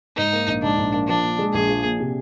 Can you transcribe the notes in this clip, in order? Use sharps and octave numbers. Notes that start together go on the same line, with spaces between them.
G#2 D#4
A#3
A#1
G#2 D4
A#1
A#3
F3 D4
A#2
G#3
A#1 G#4
F3
A#2
C3